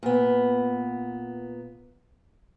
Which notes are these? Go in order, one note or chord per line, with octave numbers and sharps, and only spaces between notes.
A#2 B3